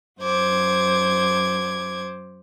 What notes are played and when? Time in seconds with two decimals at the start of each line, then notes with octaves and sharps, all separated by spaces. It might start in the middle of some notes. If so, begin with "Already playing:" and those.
0.20 F#2 C5 D6 G#6